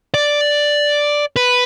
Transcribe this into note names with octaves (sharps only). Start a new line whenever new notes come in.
D5
B4